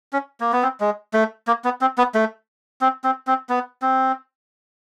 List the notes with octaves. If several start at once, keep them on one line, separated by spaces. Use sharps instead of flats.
C#4
A#3
B3
C4
G#3
A3
A#3
B3
C4
B3
A3
C4
C4
C4
B3
C4